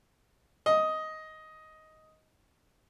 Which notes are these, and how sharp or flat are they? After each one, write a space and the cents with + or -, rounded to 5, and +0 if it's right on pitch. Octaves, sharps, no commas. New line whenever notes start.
D#5 +10